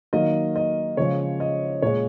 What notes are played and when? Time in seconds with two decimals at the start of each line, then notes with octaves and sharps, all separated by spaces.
0.13 D#3 F#3 A#3 D#5
0.56 D#5
0.97 C#3 F3 G#3 C#5
1.40 D#5
1.82 A#2 G#3 C#5